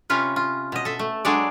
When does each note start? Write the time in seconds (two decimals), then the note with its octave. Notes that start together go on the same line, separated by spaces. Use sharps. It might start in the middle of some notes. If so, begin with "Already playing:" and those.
0.10 C3 C#4 F4 B4
0.36 F4
0.72 B2 D#5
0.85 A4 E5
0.99 A3
1.25 F#3 G#3 D4 G#4 A4 D5